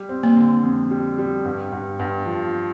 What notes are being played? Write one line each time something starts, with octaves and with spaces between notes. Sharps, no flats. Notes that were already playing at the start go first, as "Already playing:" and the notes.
Already playing: G3
C4
A#3
D3
F2
G3
G3
G2
G2
G2
F3